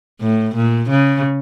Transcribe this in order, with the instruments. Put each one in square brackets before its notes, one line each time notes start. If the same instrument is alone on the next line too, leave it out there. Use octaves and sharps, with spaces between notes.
[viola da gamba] A2
A#2
C#3